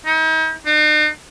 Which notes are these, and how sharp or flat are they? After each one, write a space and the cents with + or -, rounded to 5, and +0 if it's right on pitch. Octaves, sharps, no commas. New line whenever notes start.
D#4 +40
D#4 -45